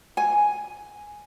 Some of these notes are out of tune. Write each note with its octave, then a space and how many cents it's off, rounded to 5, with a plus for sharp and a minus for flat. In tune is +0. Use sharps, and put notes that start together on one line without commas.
G#5 +0